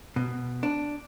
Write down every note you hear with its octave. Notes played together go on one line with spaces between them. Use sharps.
B2
D4